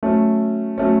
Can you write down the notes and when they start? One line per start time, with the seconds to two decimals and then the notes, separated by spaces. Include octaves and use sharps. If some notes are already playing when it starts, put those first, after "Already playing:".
0.03 F#3 A3 C#4
0.78 F#3 A3 C#4